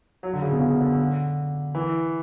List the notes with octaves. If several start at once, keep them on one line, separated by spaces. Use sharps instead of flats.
F#3
D3
C#3
B2
C#3
D3
E3